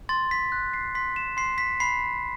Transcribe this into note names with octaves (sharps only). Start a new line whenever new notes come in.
C6 A6
B6
F#6
C7
C6 B6
E7
C6 C7
B6
B5 C7